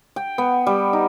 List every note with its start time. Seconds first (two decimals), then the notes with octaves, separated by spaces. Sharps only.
0.16 G5
0.38 B3
0.67 G3
0.93 D#4